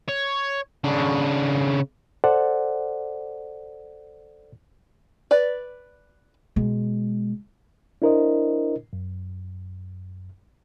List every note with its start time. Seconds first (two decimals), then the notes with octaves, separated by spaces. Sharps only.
0.09 C#5
0.84 C#3 D4
2.24 A4 C5 D5 F#5
5.31 B4 D5
6.56 B2 G#3
8.02 D4 E4 A#4 C5 D#5
8.93 F#2